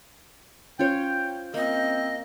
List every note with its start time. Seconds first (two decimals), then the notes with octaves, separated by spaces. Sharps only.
0.79 C#4 F4 C5 C#5 G5 G6
1.54 A#3 C4 D#5